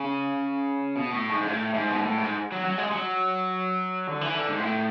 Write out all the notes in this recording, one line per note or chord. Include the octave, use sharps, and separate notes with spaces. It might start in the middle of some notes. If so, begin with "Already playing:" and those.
Already playing: C#3
B2
A2
G#2
G#2
A2
G#2
B2
A2
G#2
F#3
F#3
G#3
F#3
D3
E3
D3
G#2
A2